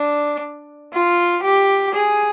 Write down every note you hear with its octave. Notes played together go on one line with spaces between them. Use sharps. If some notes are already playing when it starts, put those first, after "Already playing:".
Already playing: D4
F4
G4
G#4